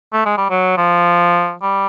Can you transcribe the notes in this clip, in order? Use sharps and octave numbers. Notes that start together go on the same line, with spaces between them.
A3
G#3
G3
F#3
F3
G3